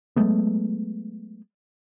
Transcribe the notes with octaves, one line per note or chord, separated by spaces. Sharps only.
F#3 G#3 A3 B3